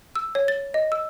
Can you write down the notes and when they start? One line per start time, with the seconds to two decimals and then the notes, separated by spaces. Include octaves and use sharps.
0.16 E6
0.35 C#5
0.48 A6
0.74 D#5
0.92 E6